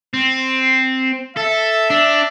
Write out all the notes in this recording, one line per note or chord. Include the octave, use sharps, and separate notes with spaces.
C4
A4 E5
D4